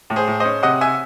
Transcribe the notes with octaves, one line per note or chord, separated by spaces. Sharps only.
A2
G#4 C5
A2
C#4 C5 D#5
C3 D#5 F#5
E5 G#5